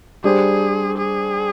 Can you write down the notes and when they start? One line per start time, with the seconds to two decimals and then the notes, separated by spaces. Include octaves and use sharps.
0.24 G3 D4 G4 G#4 C5
0.98 G#4